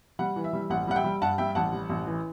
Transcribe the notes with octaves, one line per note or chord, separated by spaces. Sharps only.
G3 F#5
E3
E5
G3
A1 F#5
G3 F#5
E5 G5
G3
G2 F#5 A5
G3 E5 G5
A1 F#5 A5
G3
A1
E3